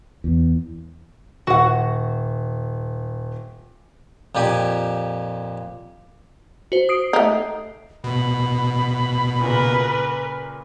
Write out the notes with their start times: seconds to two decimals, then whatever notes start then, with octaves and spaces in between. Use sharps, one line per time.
0.24 E2
1.47 D#1 F#4 F#5
4.35 F2 A#2 G4 G#5
6.72 F#4 C5
6.89 D#6 C7 D7
7.13 A3 D#4
8.04 B2 B5
9.41 A#2 C#3 A#4 B4